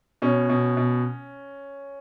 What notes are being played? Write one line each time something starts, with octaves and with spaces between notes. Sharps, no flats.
B2 C#4
B2
B2